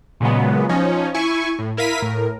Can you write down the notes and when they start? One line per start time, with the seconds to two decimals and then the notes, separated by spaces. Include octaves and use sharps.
0.20 A#2 C#3 F#3 G#3 B3
0.69 F3 C#4 D#4
1.14 E4 G#5 C#6
1.59 A2
1.77 E4 A#4 F5 B6 D#7
2.00 A2 A#4